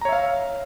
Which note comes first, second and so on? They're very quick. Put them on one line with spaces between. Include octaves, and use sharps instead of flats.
A#5 C#5 E5 F5